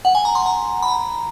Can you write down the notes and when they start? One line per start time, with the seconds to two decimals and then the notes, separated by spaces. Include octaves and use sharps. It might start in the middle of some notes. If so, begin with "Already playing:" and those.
0.05 F#5
0.15 G#5
0.25 A#5
0.35 C6
0.46 A#5
0.82 B5
0.88 A#5